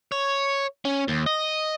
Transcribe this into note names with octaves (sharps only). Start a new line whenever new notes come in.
C#5
C#4
D#2
D#5